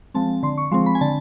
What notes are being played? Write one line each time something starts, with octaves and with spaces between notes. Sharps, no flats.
F3 G#3 C4 A5
D3 C6
C#6
F3 G#3 C4 C6
B5
G#5
D3 A5